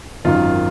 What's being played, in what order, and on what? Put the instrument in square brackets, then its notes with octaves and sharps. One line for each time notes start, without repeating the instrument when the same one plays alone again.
[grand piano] G#1 F#2 D#3 F4